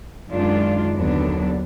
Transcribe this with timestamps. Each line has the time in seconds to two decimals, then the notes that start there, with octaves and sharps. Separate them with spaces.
0.30 F#2 D#3 G#3 D4 F4
0.94 D#2 D3 F#3 B3 D4